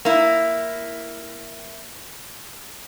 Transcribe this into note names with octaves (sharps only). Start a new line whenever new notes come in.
A#3 E4